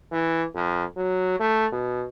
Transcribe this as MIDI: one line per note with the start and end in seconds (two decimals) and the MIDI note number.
0.11 0.45 52
0.55 0.84 41
0.97 1.38 54
1.40 1.67 57
1.73 2.06 47